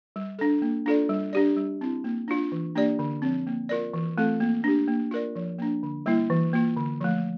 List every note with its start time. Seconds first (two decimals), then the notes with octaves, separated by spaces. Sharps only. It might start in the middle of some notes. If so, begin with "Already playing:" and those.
0.16 G3
0.39 D4 A4
0.62 A#3
0.86 D4 F4 A4 D5
1.09 G3
1.33 D4 G4 D5
1.56 G3
1.81 C4 E4
2.04 A#3
2.28 D4 F4
2.52 E3
2.75 A#3 D4 G4 D5
2.99 D3
3.22 F3 C4
3.47 A#3
3.69 F4 A#4 D5
3.94 E3
4.18 A3 C4 F4 A4
4.40 A#3
4.64 D4 G4
4.88 A#3
5.11 F4 A#4 D5
5.36 F3
5.59 A#3 D4
5.83 D3
6.06 G3 A#3 E4
6.30 E3
6.53 A#3 F4
6.77 D3
7.01 F3 A3